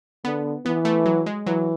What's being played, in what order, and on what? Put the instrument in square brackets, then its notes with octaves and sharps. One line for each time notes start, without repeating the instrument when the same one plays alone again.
[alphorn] D3 [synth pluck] B3
[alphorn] E3 [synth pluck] B3
[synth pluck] A3
F#3
G#3
[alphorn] E3 [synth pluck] F#3